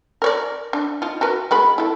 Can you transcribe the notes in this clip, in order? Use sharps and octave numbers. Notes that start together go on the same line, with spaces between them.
A#4 C#5 D5
D4
D#4 F4
F#4 A#4 B4
G#3 B3 B5
E4 A4